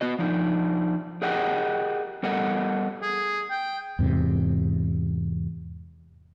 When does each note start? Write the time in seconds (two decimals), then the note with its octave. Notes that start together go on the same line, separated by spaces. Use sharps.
0.01 B3 F#4 D#5
0.19 F3 D4 D#4
1.22 G4 G#4 A#4 D#5 F#5 G5
2.23 G3 B3 A4 A#4 D#5 F#5
3.02 G#4
3.50 G5
3.99 E2 G#2 C3